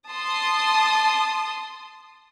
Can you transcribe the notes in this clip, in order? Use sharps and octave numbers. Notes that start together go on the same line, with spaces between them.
A5 C6 D#6